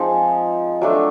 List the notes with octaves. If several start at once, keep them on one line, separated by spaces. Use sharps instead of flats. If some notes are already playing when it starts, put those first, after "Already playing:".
Already playing: F3 G#3 C4 D#4
F#3 A3 D4